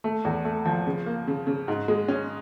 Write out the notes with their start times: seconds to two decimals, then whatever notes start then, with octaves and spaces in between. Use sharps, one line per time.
0.04 A3
0.25 E2
0.45 A3
0.65 F3
0.86 C#3
1.06 A#3
1.27 C#3
1.47 C#3
1.68 G#2
1.88 G#3
2.08 C#4